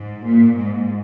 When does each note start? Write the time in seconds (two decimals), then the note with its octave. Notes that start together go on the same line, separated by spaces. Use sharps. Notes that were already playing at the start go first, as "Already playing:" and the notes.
Already playing: G#2
0.26 A#2
0.56 G#2